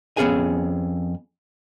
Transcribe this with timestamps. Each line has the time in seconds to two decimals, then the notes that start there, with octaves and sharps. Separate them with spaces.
0.17 F2 B3 C#4 G#4 G#5